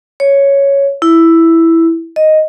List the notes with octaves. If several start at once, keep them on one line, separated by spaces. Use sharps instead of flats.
C#5
E4
D#5